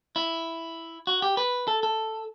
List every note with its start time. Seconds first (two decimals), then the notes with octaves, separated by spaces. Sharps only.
0.16 E4
1.07 F#4
1.22 G4
1.37 B4
1.68 A4
1.83 A4